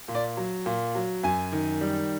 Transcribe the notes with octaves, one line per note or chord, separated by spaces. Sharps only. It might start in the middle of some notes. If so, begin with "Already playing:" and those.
A#2
D5
F#3
A#2
F#3
F#2 G#5
D#3
G3